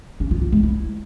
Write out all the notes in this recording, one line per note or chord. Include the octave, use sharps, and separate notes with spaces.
C#4
F4
F4
G#3
E4